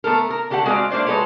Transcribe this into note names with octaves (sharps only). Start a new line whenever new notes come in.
A3 B3 A4 A#4
A#4
D3 A3 G4 A4 F#5
G#3 C4 F#4 C5 D5 F5
A3 A#3 D4 C5 D5
G#3 F#4 A4 B4 C#5